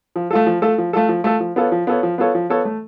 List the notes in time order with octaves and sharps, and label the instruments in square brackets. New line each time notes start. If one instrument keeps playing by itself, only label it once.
[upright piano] F3
A3 F4 A4
F3
A3 F4 A4
F3
A3 F4 A4
F3
A3 F4 A4
F3
B3 F4 A4 C#5
F3
B3 F4 A4 C#5
F3
B3 F4 A4 C#5
F3
B3 F4 A4 C#5
A3